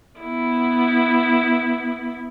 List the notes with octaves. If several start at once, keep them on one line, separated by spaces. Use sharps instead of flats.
B3 E4